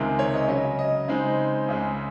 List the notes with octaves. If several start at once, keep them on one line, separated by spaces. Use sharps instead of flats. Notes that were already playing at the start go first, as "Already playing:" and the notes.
Already playing: C#2 C3 D#3 G#3 A#4
C#5
D#5
C#3 F#3 C#4 D#5
D#5
C#3 G#3 C4 D#4
C#2 C#3 G#3